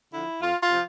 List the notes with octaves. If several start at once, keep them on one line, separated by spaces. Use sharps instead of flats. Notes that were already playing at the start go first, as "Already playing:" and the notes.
D3 F3 E4
F2 F4
F4
C3 F3